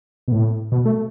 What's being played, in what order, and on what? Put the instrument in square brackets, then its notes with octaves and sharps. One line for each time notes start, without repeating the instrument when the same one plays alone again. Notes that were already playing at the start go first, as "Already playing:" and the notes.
[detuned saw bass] B2
A2
B2
A3